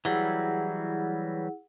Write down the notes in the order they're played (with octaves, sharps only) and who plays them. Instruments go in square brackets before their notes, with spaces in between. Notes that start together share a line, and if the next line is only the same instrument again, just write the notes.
[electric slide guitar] E3 F#3 G3 [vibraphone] E4 G#4 F#5